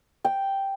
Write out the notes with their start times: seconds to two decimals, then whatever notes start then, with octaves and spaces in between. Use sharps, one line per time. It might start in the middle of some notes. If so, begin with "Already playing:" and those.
0.25 G5